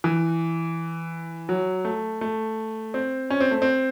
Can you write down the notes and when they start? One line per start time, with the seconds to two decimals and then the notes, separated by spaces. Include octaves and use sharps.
0.04 E3
1.49 F#3
1.85 A3
2.21 A3
2.94 C4
3.30 C#4
3.41 C4
3.51 A3
3.62 C4